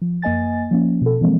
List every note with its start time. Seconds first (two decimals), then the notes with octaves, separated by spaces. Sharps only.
0.02 F3
0.22 F#2 A#3 D#5 G#5 A6
0.71 F3 A#3 C#4
1.02 B2 A4
1.21 E3 F3 G#3 A#3 C4